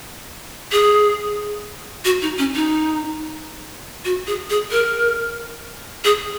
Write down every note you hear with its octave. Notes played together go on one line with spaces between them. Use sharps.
G#4
F#4
D#4
C#4
D#4
F#4
G#4
G#4
A#4
G#4